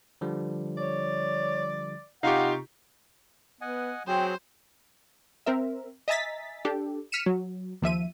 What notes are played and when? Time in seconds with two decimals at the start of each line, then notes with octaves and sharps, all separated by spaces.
0.21 D3 F3 G3
0.78 C#5 D5
2.23 C3 D#4 F4 G4 F5 F#5 A#5 C#6
3.61 B3 D#5 F#5 G#5
4.07 F#3 C4 G#4 C5 G5
5.46 C4 A#4 E5
6.08 D#5 E5 G#5 A#5 A6 B6
6.65 D4 G4 A4
7.12 F6 B6 C#7 D#7 E7
7.26 F#3
7.82 D#2 F3 E5 D#7